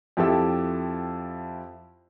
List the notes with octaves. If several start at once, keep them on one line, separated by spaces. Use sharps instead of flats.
F2 E4 G4 A4 E6